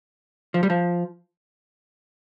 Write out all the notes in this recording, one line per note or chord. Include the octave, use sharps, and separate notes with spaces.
F3
G3
F3